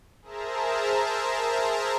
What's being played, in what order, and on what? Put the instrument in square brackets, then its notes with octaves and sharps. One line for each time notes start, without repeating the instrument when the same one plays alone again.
[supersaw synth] G#4 A#4 C5 E5 A5 A#5